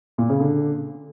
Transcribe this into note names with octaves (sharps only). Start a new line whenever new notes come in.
A#2
C#3
D3